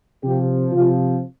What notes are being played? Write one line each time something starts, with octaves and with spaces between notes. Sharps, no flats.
C3 F3 G4
C3 F3 F4